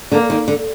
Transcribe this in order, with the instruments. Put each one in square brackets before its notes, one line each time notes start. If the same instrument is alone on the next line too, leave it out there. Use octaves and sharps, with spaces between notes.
[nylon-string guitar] D3 [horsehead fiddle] A#3
[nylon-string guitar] D#3
D3